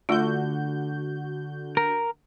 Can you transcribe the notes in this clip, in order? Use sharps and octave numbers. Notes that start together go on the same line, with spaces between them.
D3 A3 F4 F#4 G6
A#4